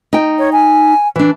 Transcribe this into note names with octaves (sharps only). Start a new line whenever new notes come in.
D#4 G5
C#5
G#5
E3 D4